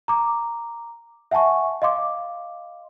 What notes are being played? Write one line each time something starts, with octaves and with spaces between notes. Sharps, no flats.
A#5 D6
E5 F#5 G#5 A5 C#6
D#5 F5 C6 D6